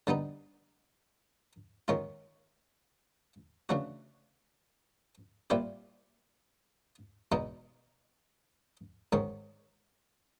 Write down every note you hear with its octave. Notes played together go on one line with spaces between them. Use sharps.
D3 G3 B3 D#4
D#3 G#3 C#4 F4
C#3 E3 A3 D4 F#4
A#2 G3 C4 E4 G4
E2 B2 G#3 B3 D#4
G#2 D#3 G#3 C#4